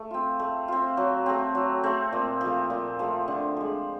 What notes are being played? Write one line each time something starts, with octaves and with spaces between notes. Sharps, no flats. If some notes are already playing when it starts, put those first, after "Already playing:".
Already playing: A3
C4 F4
A3
C4 F4
F#3
A3 C4
F#3
A3 C4
A#2
F3 A3
A#2
F3 A3
D3
F3 G#3